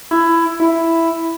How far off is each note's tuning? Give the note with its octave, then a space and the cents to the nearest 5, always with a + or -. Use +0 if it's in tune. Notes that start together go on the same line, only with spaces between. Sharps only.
E4 +15
E4 +5